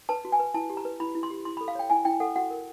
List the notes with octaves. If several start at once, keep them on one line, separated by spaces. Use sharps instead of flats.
B4 A5
F#4
G#5
B4
E4 A5
G4
A#5
B4
E4 B5
E4
C6
G4
E4 C6
B5
A4
F5
C#5 G5
E4 G#5
E4 G5
A4 F#5
F#4 F#5
A#4